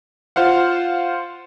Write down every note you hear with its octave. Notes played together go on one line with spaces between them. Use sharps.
F4 C5 F5 F#5